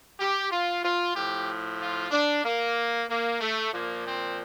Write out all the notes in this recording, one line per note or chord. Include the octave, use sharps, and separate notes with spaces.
G4
F4
F4
A2 F3 G4
F4
D4
A#3
A#3
A3
A#2 F3 A#3
C4